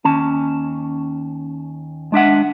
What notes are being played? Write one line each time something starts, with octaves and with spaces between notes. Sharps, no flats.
D#2 C#4 A5
G#3 D4 E5 F#5